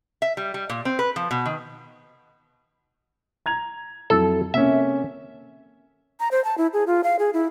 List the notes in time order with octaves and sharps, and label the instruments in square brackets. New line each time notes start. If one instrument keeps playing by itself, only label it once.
[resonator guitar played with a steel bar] E5
G3
G3
A#2
C4
B4
F3
B2
D#3
[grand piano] A#5 G#6 F7
[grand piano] F2 F#3 E4 [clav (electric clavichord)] A4
[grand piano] C3 A#3 C#4 [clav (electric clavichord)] E5
[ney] A#5
C5
A5
E4
G#4
F4
F5
G#4
E4